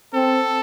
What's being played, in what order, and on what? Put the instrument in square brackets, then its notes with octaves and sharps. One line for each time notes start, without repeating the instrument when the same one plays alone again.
[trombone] C4 [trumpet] A4